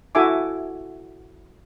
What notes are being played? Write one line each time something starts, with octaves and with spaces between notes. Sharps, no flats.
E4 F#4 A4 E5 G#5 D6